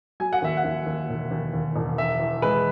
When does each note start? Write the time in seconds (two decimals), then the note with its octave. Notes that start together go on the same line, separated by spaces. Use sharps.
0.20 F#3 G#5
0.33 F#5
0.42 D#2 E5
0.57 F#5
0.64 D#2
0.86 D#2
1.09 E1
1.31 D#2
1.54 D#2
1.76 E1
1.98 D#3 E5
2.20 E2
2.42 G#3 B4